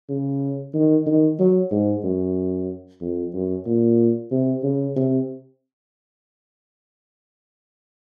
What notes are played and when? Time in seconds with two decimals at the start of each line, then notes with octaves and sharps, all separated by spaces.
0.09 C#3
0.74 D#3
1.07 D#3
1.39 F#3
1.71 G#2
2.04 F#2
3.01 F2
3.34 F#2
3.66 A#2
4.32 C3
4.64 C#3
4.96 C3